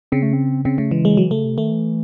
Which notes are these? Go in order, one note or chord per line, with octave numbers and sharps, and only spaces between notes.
C#3 C4
A3
C4
C#3 C4
C#3 A3
E3 G#3
F#3 G#3
E3 F#3
C#3 A3
C3
D#3 A3
E3